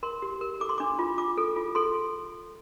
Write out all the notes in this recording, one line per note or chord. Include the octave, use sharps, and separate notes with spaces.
A#4 C6
G4
A#4
A4 D6
C6
D4 D6
F4
F4 D6
A4
F4
A4 C6